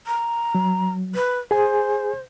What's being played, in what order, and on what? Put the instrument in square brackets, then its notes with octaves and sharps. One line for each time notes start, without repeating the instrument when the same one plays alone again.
[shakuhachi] A#5
[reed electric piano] F#3
[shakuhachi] B4
[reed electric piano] G#4 G#5 [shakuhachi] C5